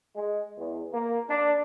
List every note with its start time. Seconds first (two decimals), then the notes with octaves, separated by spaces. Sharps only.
0.16 G#3
0.56 E2
0.92 A#3
1.29 D4